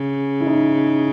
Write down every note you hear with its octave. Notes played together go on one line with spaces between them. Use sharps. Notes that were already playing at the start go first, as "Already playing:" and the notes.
Already playing: C#3
E4
D#4